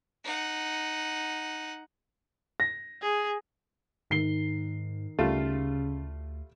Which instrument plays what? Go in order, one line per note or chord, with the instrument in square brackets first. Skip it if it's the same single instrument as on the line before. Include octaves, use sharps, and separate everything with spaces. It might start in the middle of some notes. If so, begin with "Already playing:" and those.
[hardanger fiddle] D#4 F#5
[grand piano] A#6
[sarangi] G#4
[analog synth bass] G#2 [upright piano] D#3 C7 G7
[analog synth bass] D2 [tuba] C#3 [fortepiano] G3 A3 F4